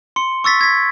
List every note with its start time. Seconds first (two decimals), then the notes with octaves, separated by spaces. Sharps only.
0.16 C6 C#7
0.44 C#6 E6 A6 B6
0.61 G#6 B6